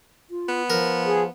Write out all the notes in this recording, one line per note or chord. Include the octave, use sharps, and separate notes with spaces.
F4
B3
F3 A#4
G#4